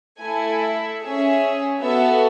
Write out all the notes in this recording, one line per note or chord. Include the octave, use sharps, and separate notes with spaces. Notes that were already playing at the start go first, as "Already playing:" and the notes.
A3 E4 A4 G#5
E5
C#4 G#4 E5
B3 F#4 A4 E5